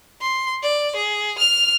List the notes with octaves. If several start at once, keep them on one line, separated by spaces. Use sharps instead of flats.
C6
D5
G#4
F6 F7